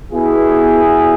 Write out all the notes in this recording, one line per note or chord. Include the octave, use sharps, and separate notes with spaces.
B2 B3 E4 G#4
E2 B2